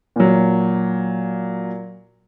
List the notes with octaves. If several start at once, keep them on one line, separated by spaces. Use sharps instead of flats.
A#2 F#3